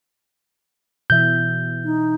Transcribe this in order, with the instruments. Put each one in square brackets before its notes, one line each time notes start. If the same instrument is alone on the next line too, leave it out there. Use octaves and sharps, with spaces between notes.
[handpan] B2 E3 E5 [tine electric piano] G6
[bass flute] D#4